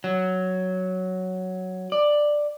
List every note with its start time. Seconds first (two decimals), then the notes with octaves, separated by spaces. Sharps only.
0.04 F#3
1.92 D5